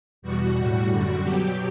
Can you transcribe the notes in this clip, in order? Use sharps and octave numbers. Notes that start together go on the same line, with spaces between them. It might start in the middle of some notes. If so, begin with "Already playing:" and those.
E2 B2 G3 F#4
A2 G3
F#2 D3 G3
B2 F#3 G4